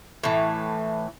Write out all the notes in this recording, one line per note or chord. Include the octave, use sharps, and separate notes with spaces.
A2 E3